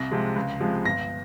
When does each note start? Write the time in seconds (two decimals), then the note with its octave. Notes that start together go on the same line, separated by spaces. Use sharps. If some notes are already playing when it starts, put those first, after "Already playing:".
Already playing: C2 A#6
0.11 C3 F3 G#3
0.36 C#2
0.60 C3 F3 G#3
0.85 G1 A#6